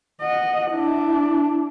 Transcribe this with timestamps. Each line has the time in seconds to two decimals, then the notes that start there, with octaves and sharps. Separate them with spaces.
0.21 D#5 F#5
0.71 D4 E4